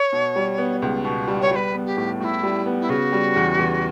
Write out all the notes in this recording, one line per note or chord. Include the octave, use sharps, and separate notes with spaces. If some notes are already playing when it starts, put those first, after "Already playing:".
Already playing: C#5
B2
G3
B3
C#2
B2
G3
C#5
G3 B4 C#5
B3
G4
A2
A2 E4 F#4
G3
B3
E4
C#3 F#4
G3
E2
E2